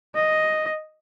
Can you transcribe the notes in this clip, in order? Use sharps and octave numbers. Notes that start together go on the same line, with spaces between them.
D#5